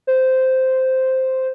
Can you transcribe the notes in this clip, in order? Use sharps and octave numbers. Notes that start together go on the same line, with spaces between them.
C5